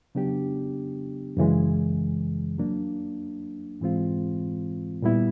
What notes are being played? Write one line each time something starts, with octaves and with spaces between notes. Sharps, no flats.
C#3 F#3 B3 D4 G4
F#2 C#3 E3 G#3
F#3 A#3 D4
G#2 E3 G#3 C4 F4
A#2 G3 B3 E4